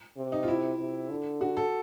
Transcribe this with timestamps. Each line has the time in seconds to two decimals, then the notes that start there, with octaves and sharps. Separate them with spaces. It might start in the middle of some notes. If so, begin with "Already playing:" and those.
0.17 C3
0.32 D#4
0.43 F4
0.48 E4
0.79 C3
1.10 D3
1.41 F#4
1.57 A4